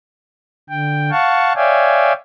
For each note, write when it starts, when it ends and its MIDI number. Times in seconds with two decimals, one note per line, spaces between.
0.69 1.11 50
0.69 1.11 79
1.11 1.53 77
1.11 1.53 78
1.11 1.53 81
1.11 1.53 85
1.56 2.13 73
1.56 2.13 74
1.56 2.13 76
1.56 2.13 77
1.56 2.13 79
1.56 2.13 80